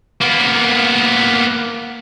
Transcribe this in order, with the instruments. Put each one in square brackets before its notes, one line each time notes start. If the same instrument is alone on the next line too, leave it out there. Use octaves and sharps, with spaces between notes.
[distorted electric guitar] A#3 B3